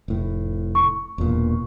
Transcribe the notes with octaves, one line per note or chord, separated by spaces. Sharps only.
F1 A2
C#6
E1 E2 A#2